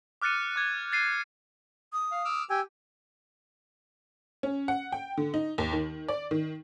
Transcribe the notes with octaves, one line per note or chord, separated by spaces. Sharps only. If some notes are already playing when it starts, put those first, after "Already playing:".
D6 F6 F#6 A6 C#7 D#7
D6 G#6
A6 C7 D#7
D#6
F5
D6 E6 F6
G4 G5 G#5 E6
C#4
F#5
G5
D3
D#4
D#2
D#3
D5
D#3